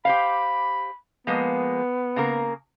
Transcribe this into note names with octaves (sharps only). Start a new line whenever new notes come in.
G4 C5 F5 B5
F3 G#3 A#3 B3
C#3 A#3 A#4